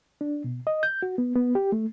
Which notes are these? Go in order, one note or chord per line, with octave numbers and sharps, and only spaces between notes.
D4
B2
D#5
G6
F#4
B3
B3
G4
A3